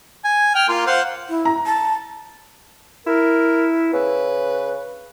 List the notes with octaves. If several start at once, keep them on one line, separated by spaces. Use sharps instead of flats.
G#5
G5 F6
A#3 F4
C5 F5 F#5
E4
A#5
A5
E4 A#4
C#3 B4